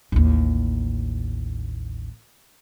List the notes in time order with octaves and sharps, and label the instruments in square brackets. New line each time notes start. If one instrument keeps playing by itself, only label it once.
[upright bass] A1 D#2